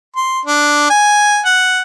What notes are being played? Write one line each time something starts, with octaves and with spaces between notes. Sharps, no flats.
C6
D4
G#5
F#5